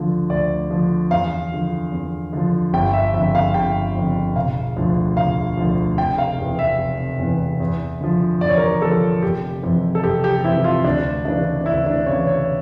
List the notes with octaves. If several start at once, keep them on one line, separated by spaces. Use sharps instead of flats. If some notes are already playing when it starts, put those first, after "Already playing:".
Already playing: D2 D3 F3
D2 D5
D3 F3
E2 F5
D3 F3
E2
D3 F3
G1 G5
E5
F2 D3 E5
F5
G1 G5
F2 D3
E1 F5
D2 D3 F3
E1 F5
D2 D3 F3
F1 G5
F5
E2 E3
E5
F1
E2 E3
E2
D3 F3
E2 D5
C#5
A#4
C#5
D3 F3 A4
F1 G4
F2 E3
A4
F1 G4
G4
F2 E3 E4
F4
D2 D4
C#3 E3 D4
D4
D2 E4
D4
C#3 E3 C#5
C#5